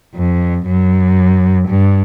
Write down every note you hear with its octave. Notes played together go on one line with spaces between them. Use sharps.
F2
F#2
G2